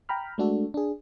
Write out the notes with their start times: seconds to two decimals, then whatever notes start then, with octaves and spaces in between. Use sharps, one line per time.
0.09 G5 A#5 B5 F6
0.38 G#3 A3 D4 F#4 A4
0.74 D4 G#4